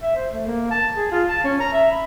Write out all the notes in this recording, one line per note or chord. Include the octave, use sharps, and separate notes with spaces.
E5
C5
A3
A#3
A5
G#4
F4
A5
C#4
A#5
E5
B5